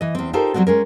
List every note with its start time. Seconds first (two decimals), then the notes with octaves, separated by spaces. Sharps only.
0.01 E3 D#5
0.15 E2 C4
0.33 D#4 F4 G4 A4 A#4 C5
0.54 F#3 G3 A3 C4 F#4
0.67 G#3 C#4 A#4